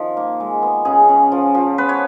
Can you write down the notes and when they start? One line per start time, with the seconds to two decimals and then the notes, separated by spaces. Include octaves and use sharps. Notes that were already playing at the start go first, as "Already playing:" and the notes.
Already playing: D#3 F3
0.17 A#3
0.40 G#3
0.62 B3
0.85 C#3 G#4
1.09 C#4
1.32 F3
1.54 F3
1.78 B3 B4
1.89 C#5